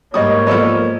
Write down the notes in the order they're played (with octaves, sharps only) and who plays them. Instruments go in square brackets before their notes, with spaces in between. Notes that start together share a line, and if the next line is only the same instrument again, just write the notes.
[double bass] G#2 A#3 [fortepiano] G3 D#6 [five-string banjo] F#4 D#5 [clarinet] C#5
[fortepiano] F3 B3 [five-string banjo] A4 D5 D#5